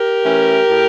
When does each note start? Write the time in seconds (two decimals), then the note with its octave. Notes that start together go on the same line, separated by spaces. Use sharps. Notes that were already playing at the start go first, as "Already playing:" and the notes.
Already playing: G4 A#4
0.25 E3 A3 C#4
0.70 A2